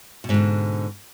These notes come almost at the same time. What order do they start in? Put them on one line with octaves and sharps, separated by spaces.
B2 G#2 D3